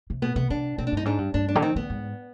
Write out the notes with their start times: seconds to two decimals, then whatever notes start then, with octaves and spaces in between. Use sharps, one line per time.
0.10 C3
0.22 B2 B3
0.36 C3 B3
0.50 C3 D4
0.78 B2 C4
0.87 D4
0.92 G2 D#4
1.05 G#2 D4
1.18 G2
1.34 G2 D4
1.48 D4
1.55 D3
1.62 D#3 C4
1.76 D3 B3
1.90 G#2